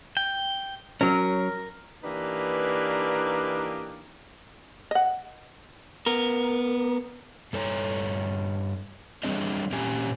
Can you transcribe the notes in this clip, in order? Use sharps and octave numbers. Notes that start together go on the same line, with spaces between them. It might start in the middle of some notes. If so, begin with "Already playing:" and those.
G5
F#3 C#4 A#4
E3 A#3 D4 D#4 G4 B4
D#5 F#5
B3 A#4
G2 A4 C#5 A5 A#5
G3 C4 D4 G#4 C#5 D#5
A#2 C4 C#4 G4 E5 G#5